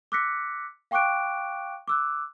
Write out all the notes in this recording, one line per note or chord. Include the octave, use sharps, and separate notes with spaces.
D6 E6 F#6 A#6 B6 C#7
F5 G5 C#6 D6 F#6 D7
D6 E6 F#6